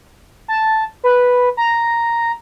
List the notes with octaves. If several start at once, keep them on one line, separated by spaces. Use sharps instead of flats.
A5
B4
A#5